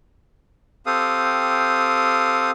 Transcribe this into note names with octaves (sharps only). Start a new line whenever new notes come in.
C4 G4 A4 F5 D#6